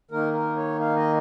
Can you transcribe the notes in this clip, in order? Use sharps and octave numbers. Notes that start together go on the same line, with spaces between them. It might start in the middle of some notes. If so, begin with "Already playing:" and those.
D#3 A#3 D#4 A#4
A#4
C#5
F5
D#5